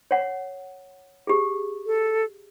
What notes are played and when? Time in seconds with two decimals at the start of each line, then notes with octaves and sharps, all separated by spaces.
0.11 C#5 F#5
1.27 G4 G#4
1.86 A4